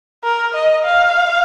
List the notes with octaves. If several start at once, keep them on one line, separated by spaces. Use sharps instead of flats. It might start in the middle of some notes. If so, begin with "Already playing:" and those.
A#4
D#5
F5